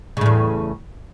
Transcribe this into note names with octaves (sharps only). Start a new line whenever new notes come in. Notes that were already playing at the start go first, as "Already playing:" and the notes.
E2 A2 C#3